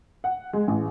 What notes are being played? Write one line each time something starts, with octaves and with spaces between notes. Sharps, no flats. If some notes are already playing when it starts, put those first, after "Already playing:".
F#5
G#3
A1